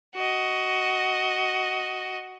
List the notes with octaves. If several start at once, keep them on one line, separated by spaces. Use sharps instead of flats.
F#4 D#5